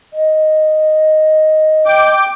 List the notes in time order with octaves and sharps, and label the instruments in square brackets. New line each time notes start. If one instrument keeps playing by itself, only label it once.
[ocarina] D#5
[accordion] G5 D6